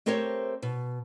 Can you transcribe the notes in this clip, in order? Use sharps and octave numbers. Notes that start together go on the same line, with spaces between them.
A3 C4 G4 A#4 C5 C#5
B2